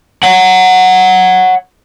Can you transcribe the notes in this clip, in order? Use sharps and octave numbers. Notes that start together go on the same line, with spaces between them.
C#5 F#5